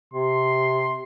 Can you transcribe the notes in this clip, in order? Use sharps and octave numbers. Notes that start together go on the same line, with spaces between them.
C3 C6